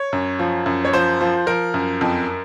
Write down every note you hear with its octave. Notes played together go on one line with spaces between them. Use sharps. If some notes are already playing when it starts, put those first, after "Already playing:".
Already playing: C#5
F#2
F3
F#2
C#5
F3 C5
F3
F3 A#4
F#2
F2